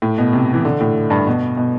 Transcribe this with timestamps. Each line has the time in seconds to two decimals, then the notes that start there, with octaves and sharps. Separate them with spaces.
0.02 A2
0.18 B2
0.33 C3
0.54 E3
0.65 D3
0.80 A2
1.10 G2
1.27 B2
1.57 B2